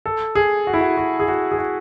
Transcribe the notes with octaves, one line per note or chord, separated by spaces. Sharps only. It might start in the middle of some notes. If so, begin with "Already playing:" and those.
A4
G#4
F#4
E4
F#4
F#4
G#4
F#4
G#4
F#4